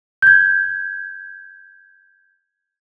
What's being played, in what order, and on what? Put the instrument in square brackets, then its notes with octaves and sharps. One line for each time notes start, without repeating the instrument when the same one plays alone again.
[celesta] G6 G#6